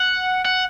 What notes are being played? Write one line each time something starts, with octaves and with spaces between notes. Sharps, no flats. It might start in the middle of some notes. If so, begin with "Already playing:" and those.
Already playing: F#5
F#5